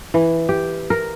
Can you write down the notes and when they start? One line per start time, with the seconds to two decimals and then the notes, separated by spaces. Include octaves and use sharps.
0.14 E3
0.49 G4
0.90 A#4